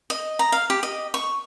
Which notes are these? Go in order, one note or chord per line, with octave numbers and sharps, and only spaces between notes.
D#5
A#5
F5
G4
D#5
C#6